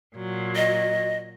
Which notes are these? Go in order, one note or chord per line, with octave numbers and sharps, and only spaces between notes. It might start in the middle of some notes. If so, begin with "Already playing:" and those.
A#2 F#3
D#5